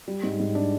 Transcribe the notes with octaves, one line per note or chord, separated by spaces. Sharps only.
G3
G#2
G#2
D4